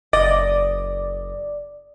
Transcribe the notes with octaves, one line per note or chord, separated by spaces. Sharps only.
F#1 D5 D#5